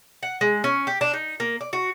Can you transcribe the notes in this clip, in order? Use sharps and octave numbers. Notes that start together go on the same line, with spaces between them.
F#5
G#3
C#4
G4
D4
D#4
A#3
D5
F#4